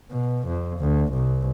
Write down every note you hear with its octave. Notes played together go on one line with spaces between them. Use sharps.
B2
F2
D2
C2